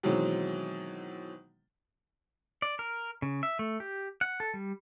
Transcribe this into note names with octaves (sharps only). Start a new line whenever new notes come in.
B2 D#3 E3 F#3 G#3 C4
D5
A#4
C#3
E5
A3
G4
F#5
A4
G3